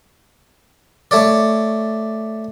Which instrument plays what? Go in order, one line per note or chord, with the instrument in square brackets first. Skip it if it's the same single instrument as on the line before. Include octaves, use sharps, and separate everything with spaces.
[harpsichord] A3 C#5 D5